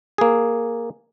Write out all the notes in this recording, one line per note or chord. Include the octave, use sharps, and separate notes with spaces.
A#3 G#4